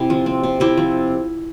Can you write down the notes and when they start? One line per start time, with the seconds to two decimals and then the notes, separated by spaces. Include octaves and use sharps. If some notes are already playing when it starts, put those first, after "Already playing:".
Already playing: C3 C4 E4 G4
0.10 F3
0.26 C4
0.43 C3
0.60 C3 E4 G4
0.77 F3